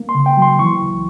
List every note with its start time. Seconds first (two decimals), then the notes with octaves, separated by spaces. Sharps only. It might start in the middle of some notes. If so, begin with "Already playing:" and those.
Already playing: A#3
0.09 C6
0.15 C#3
0.26 G5
0.37 F#3 C6
0.59 E3 C#6
0.82 C#2